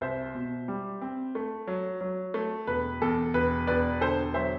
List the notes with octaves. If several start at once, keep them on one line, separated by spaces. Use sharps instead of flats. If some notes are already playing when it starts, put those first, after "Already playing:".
C2 C5 E5
B2
G3
C4
A3
F#3
F#3
A3
E1 B4
E2 A4
E1 B4
E1 B4 D5
D3 A4 C5
F#3 C5 E5